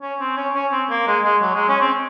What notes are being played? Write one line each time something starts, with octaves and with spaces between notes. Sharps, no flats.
C#4
C4
C#4
C#4
C4
A#3
G#3
G#3
F#3
G#3
C#4
C4